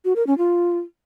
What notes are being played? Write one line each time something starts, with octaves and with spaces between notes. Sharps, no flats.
F#4
A#4
C#4
F4